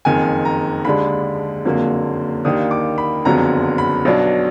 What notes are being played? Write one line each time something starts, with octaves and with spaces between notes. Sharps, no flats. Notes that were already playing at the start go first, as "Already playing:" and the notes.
F#1 F2 D#3 G#5
A#5
D#2 D3 G#3 D4 B5
F#1 F2 D3 F#3 A#3
D#2 D#3 A#3 D4 D#6
D6
B5
F#1 F2 D3 F#3 B3 A#5
B5
B1 B2 F#3 D4